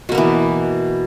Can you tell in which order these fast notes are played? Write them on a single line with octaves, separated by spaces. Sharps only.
B2 A#3 B3 E3